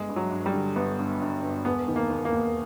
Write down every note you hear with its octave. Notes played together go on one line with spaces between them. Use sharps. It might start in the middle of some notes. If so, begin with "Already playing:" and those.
Already playing: G1 G#3
G2
F#3
G2
G3
D3
G1 B3
G2
G2
G1
E1 B3
D#3
A#3
D#2
A#3
D#2